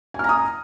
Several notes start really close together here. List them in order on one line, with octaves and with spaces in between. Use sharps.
G#5 F6 A#5 D#6